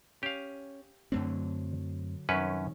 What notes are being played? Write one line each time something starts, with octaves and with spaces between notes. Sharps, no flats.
C#4 G4 F5
F#2 D3 F#3 A3 C4 D4
C2 F#2 D#3 C#4 B4 C#5